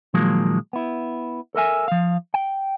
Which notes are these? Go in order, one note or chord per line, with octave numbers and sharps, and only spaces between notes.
A#2 D#3 F3 F#3 G#3 A#3
B3 E4
A4 A#4 E5 G#5
F3 F5
G5